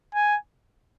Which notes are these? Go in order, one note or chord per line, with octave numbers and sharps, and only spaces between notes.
G#5